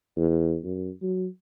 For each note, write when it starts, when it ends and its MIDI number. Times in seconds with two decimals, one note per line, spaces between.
0.17 0.57 40
0.64 0.90 42
1.02 1.27 54